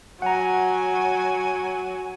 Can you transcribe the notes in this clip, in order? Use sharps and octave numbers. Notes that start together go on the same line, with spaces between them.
F#3 F#5 G#5 A#5